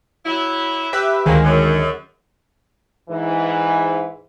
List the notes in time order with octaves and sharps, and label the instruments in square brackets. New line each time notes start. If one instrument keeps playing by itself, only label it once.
[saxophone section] F#3 E4
[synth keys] G4 B4 E5
[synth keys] D2 D#3 G#3 [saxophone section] F#3 A#3 C4
[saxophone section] F#2
[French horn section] G#2 E3